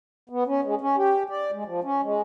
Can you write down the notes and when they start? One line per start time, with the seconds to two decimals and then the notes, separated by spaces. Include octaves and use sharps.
0.30 B3
0.47 C#4
0.64 G#3
0.81 C#4
0.97 G4
1.30 D5
1.52 G#3
1.65 F3
1.83 C#4
2.03 G#3